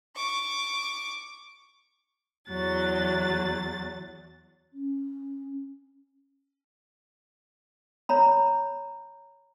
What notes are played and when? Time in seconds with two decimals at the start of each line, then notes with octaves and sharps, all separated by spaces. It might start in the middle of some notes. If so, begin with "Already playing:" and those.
0.16 C#6 D6
2.48 E2 F#3 A6
4.73 C#4
8.09 C#5 A#5 B5